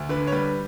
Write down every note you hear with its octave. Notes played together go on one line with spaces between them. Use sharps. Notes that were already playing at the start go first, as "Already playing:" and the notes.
Already playing: D2
D3 B4
C#5
G3 B4